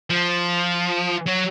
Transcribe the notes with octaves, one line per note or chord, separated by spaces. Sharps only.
F3
F#3